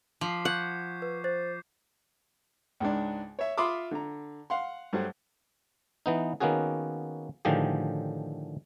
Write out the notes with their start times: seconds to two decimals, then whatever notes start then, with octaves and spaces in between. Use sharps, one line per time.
0.21 F3 D6 B6 C7
0.45 F#5 C#6 G6 G#6
1.02 B4
1.24 C5 A6
2.80 C#2 G#2 D4
3.39 C#5 E5
3.57 F4 E5 B5 C6 D6 D#6
3.91 D3 A#5
4.50 F5 F#5 C6
4.93 G2 F#3 A3 C5 F#5
6.06 E3 B3 D#4
6.40 D#3 A#3 B3 C#4 F#4 G#4
7.45 A2 D3 D#3 F3 G4 G#4